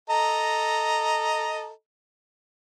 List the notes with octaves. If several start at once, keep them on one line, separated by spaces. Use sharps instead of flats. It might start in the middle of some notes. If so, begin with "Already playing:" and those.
A4 D#5 A#5